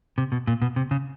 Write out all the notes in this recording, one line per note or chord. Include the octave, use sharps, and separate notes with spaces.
C3
B2
A#2
B2
C3
C#3